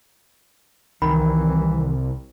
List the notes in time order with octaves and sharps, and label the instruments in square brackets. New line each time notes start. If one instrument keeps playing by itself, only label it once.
[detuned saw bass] C2 [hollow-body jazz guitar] D#3 [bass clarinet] E3 [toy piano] B5